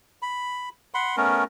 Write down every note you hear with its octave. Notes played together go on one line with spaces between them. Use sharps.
B5
F#5 B5 C6
A3 B3 C#4 A#4